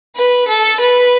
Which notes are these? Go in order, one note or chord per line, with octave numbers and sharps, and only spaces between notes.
B4
A4
B4